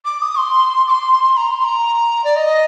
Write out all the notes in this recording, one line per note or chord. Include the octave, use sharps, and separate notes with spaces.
D6
D#6
C6
D6
C6
C6
A#5
C6
A#5
D5
D#5